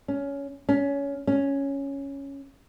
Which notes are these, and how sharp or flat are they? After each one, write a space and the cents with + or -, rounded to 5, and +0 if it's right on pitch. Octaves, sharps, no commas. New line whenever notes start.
C#4 +15
C#4 +20
C#4 +0